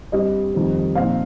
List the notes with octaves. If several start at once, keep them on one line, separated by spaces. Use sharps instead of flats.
G2 G3 C4 D#5
F2 D#3 G3 C4
A#2 F3 C4 D#4 F5